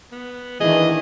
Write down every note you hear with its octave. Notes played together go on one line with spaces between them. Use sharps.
B3
D#3 E3 D4 G#4 D#5